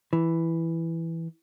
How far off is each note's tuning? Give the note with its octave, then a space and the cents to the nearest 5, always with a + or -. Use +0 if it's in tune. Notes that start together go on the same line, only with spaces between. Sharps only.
E3 +0